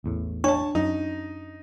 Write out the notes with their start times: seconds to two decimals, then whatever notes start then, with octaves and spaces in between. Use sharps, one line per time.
0.04 A1 E2 A2
0.44 D4 C#5 A5 C#6
0.75 F#2 D#4